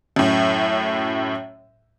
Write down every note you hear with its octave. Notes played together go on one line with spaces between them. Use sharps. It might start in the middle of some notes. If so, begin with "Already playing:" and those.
F#2 A2